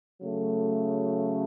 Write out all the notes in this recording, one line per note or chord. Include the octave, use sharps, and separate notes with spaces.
C#3 F#3 A3